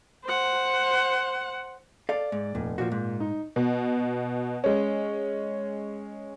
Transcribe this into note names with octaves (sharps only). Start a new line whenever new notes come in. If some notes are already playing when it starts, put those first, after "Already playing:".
C5 F#5
A4 D5 F5
G#2
F1 A#2
A#2 F3 F#4
G#2
D#4
B2
G#3 C#4